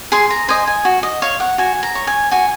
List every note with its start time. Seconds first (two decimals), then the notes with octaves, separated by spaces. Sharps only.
0.12 G#4 C6
0.30 A#5
0.48 C5 D#5 G#5
0.67 G#5
0.85 F#4
1.03 D#5
1.22 C#5 F5
1.40 F#5
1.58 F#4 G#5
1.83 A#5
1.95 C#5
2.07 G#5
2.31 F#4 G#5